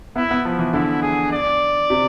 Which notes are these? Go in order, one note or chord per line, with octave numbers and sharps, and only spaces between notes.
B3 E4
B3
F3
E3
D3 E4
G#4
D5
C3